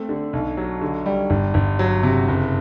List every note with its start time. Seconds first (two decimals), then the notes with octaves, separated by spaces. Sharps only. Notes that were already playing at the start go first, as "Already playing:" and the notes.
Already playing: A3 C4
0.09 D3
0.33 B1
0.57 F#3
0.81 D3
1.06 G3
1.30 G1
1.54 G1
1.79 F#3
2.03 C3
2.28 F#1